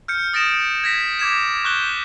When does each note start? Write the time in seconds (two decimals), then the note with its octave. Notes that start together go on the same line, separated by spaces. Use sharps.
0.08 F6 G6 C#7
0.33 D#6 A6 A#6 D7 E7
0.84 G#6 A#6 B6
1.19 D6 G#6 B6 E7
1.65 C#6 F#6 G6 G7